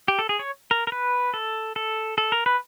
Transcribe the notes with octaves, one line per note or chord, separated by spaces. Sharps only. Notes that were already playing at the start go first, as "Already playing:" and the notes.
G4
A4
G#4
C#5
A#4
A#4
B4
A4
A4
A4
A#4
B4